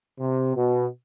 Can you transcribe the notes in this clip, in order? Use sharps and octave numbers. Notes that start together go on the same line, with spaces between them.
C3
B2